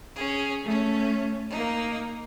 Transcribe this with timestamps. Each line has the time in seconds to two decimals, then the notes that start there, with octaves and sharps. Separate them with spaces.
0.14 C#4 G#4
0.63 A3 C#4
1.49 A#3 D#4